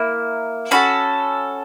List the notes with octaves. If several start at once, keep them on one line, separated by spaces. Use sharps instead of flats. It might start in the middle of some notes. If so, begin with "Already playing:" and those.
Already playing: A#3 E4
C#4 F#4 A4 B5